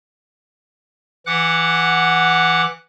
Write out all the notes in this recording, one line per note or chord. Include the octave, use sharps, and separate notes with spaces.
E3 F#5 D6 F#6